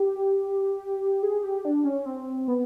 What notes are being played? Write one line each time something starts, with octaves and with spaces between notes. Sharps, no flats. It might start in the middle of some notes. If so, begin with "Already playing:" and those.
Already playing: G4
G#4
G4
D4
C#4
C4
B3